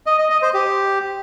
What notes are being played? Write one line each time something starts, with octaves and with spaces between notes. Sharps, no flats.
D#5
D#5
D#5
C5
G4